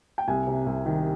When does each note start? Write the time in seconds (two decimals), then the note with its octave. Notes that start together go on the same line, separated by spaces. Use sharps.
0.18 G5
0.28 C2 G#5
0.47 C3
0.66 C2
0.86 D#3